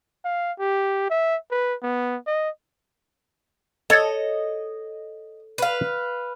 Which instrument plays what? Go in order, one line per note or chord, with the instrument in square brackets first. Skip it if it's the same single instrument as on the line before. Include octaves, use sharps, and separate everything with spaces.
[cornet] F5
G4
E5
B4
B3
D#5
[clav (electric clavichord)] A4 C#5 [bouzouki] D#5
[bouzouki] B4 F5